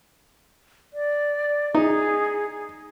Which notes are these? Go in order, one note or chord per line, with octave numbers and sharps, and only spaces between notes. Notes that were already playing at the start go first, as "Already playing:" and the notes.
D5
D#4 G#4